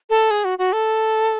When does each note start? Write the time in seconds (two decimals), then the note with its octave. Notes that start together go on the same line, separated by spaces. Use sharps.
0.10 A4
0.31 G#4
0.45 F#4
0.59 F#4
0.73 A4